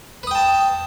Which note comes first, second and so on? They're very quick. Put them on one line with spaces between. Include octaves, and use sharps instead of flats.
B4 D#6 G5 A5